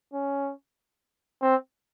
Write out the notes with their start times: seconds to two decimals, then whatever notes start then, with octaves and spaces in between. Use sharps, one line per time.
0.14 C#4
1.42 C4